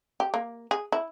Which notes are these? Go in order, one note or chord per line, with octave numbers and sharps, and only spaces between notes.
G4
A#3
G#4
E4